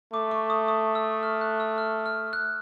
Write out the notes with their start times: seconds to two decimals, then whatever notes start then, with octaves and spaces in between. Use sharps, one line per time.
0.13 A3 D6
0.31 C#6
0.50 D#6
0.68 D#6
0.95 E6
1.23 F6
1.41 F#6
1.60 E6
1.78 F6
2.06 F6
2.33 F#6